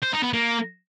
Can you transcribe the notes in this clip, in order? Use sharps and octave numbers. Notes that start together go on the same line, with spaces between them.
C5
D#4
B3
A#3